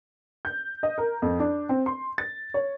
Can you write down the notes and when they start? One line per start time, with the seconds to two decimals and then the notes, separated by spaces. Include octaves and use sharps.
0.45 G6
0.83 D#5
0.98 A#4
1.22 F2
1.39 D4
1.69 C4
1.86 C6
2.18 A6
2.54 C#5